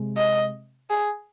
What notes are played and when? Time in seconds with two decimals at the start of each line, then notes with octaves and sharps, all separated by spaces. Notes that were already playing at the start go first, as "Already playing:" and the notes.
Already playing: C3 G#3
0.17 D#5
0.90 G#4